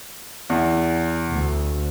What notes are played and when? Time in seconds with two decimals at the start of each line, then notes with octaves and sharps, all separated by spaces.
0.50 E2
1.32 D2